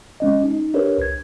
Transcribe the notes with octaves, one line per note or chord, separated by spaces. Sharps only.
G#3 C#4 D#5
D#4
D4 G4 A#4 B4 C#5
C2 G#6